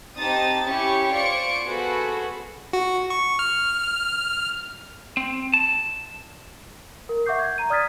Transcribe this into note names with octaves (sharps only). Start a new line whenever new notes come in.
C4 D#4 G4 A5 D#6 A6
C#4 E4 G4 C#5 C#6
F4 C5 D5 C#6 C#7 D7
B3 F#4 G#4 A4 B4 C5
F#4
C#6
F6
C4
A5
A#4
E5 F#5 C#6 D6 G6 C7
G6 G#6
A#5 D#7
D5 D#6 F6 G#6 A6 B6